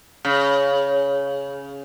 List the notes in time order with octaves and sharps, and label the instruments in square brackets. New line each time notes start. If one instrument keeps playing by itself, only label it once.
[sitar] C#3